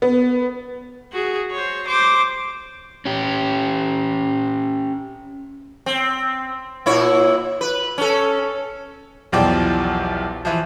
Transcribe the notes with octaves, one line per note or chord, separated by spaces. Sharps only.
B3
F#4 G#4
C5 C#5
C5 D6
C#4 G4
C4
A#2 E4 C#5
B4
C#4 A4
B1 E2 F3 G4 D5 G5
E3 F3